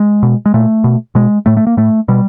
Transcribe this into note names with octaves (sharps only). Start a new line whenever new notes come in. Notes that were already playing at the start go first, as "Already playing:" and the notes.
Already playing: G#3
B2
G#3
A#2 A3
B2
B2 G#3
A2 A3
A3
A#3
A2 A3
B2 G3